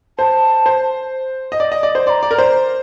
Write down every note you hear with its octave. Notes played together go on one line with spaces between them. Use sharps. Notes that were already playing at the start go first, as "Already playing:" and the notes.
C5 A5
C5
D#5
D5
D#5
D5
C5
D5 A#5 C6
D5
A#4
C5